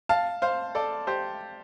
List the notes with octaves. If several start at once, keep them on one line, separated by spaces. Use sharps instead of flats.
F5 A5
C5 F5
A4 D5
G4 C5